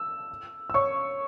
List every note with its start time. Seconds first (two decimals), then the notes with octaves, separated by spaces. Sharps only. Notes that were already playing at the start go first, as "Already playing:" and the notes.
Already playing: E6
0.70 E6
0.74 C#5 C#6